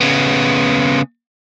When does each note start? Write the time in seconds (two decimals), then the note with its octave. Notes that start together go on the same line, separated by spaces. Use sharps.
0.01 C#3 B3